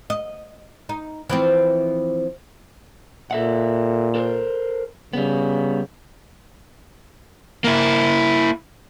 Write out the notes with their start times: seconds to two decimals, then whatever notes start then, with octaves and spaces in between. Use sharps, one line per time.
0.10 D#5
0.89 D#4
1.29 E3 F3 C4
3.31 A#2 A4 E5 F#5
4.15 A4 A#4 C5
5.13 C#3 G3 B3
7.64 A#3 E4